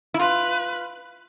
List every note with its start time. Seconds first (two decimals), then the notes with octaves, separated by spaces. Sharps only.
0.14 E4
0.19 F4 B4